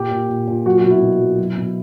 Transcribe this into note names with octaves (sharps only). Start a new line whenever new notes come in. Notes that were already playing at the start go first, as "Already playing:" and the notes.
Already playing: A#2 G4
A#2
A#2
A#2
F#3 F#4
F#4
B2
E4
B2
F#3
F#3
B2